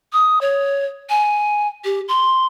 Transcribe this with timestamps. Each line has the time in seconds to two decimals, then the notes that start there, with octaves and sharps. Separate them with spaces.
0.13 D#6
0.41 C#5
1.10 G#5
1.85 G4
2.08 C6